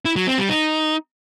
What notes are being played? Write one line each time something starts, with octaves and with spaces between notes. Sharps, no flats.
E4
F#3
C4
G3
D#4